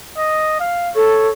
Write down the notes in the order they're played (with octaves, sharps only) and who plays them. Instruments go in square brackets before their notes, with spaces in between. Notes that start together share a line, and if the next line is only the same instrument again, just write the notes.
[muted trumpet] D#5
F5
[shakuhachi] A4 [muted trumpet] C#5